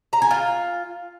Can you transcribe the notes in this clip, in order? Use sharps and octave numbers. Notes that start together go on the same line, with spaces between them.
A#5
G#5
F4